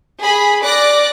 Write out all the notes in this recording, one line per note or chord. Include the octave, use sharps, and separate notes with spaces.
G#4 B5
D5 D6 F#6 A#6